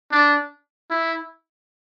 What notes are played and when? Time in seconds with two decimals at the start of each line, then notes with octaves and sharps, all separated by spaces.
0.11 D4
0.90 E4